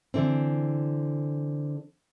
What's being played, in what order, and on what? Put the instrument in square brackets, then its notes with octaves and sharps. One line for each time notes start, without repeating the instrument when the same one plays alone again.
[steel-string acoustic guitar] D3 E3 C4